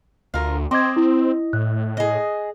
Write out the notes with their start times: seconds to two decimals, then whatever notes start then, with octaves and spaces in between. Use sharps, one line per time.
0.34 D2 F4 A#4
0.71 C4 D#5 C6 D6 G#6
0.96 E4
1.53 A2 F#6
1.97 G#4 D#5